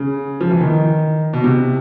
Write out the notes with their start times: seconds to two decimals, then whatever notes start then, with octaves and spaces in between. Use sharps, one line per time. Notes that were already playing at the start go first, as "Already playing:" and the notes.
Already playing: C#3
0.41 F3
0.51 E3
0.61 D#3
1.33 B2
1.44 C3